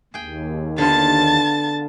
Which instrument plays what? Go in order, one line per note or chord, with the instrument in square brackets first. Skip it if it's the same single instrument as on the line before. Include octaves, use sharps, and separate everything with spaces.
[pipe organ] D#2 [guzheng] G#4 G5
[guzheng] D3 B3 F4 [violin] A5 A6